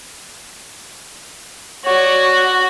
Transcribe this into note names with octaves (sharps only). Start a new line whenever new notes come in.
F#4 C#5 D5